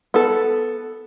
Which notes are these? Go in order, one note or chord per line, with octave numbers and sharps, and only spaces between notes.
B3 A4